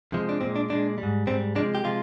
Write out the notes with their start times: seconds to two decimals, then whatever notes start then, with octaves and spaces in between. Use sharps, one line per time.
0.12 F2 C3 F3 G#3
0.29 D4
0.41 A#2 G#3 C4
0.56 D4
0.70 A#2 G#3 D4
0.98 G3
1.03 G#2
1.27 G#2 G3 C4
1.55 C3 F3 G#3 D4
1.75 G4
1.84 C3 F3 G#3 F4